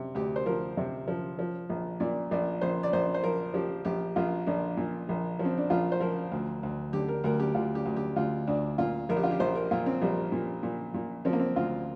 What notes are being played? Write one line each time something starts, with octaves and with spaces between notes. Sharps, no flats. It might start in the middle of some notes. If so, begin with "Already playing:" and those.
Already playing: C3
D2 G4
C5
F3 A#4
C3
F3
F3
A#1
A#2 D5
A#1 D5
A#1 C5
D5
A#1 C5
C5
F3 A#4
F3 G4
A#1 G4
A#1 F4
A#1 D4
A#2
A#1
F3
C4
D4
A#1 F4
C5
F3 A#4
D2
D2
D3 G4
A#4
D2 A#4
G4
D2 F4
G4
D2
G4
D2 F4
D2 D4
A#2 F4
A#1 A#4
G4
F4
G4
A#1 C5
A#4
A#2 F4
C4
A#1 G3
A#2
A#2
A#2
F3 C4
A#3
C4
D2 F4